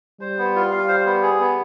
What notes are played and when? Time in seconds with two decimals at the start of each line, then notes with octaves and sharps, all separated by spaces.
0.21 G3 C5
0.38 B3
0.55 F4
0.72 F5
0.88 C5
1.06 B3
1.22 G#4
1.40 B3